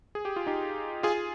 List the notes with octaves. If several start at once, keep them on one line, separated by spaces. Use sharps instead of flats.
G#4
G4
F4
D#4 G4
F4 G#4